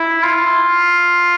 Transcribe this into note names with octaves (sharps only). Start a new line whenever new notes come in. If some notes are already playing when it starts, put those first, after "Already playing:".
Already playing: E4
F4